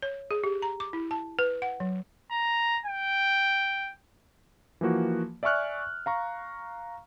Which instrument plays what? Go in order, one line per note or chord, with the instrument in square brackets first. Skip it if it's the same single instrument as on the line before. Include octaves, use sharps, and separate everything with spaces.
[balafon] C#5
G#4
G4
A#5
D6
E4
A5
B4
F#5
F#3
[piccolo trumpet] A#5
G5
[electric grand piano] E3 F3 A#3 F#4
D5 E5 G#5 C#6 F6 F#6
F5 A#5 C#6